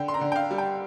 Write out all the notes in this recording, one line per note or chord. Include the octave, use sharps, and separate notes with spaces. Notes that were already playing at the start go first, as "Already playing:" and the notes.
Already playing: D3 G5
C6
A#5
D3
G5
F5
G3
G5